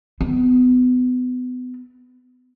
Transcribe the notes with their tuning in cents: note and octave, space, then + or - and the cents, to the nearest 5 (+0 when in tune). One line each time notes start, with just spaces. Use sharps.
B3 +30